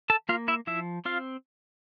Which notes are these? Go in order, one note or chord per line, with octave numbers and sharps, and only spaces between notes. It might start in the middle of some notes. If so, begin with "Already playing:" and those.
A4 A5
A#3 F4 F5
E4 E5
F3 E4 E5
C4 F4 F5